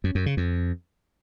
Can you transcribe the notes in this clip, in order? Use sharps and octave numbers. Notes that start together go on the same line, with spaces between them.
F#2
F#2
C#3
F2